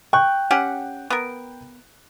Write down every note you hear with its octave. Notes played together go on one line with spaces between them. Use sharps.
G5 C#6 F#6
C#4 G4 F#5
B3 A#4